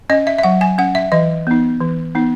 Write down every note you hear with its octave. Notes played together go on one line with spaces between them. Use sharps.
C#4 D#5
E5
E5
F#3 F#5
G#5
C#4 F#5
E5
E3 D#5
B3 D#4
E3
B3 D#4